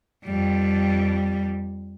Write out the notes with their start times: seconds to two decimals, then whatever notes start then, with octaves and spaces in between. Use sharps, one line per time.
0.24 F2 G3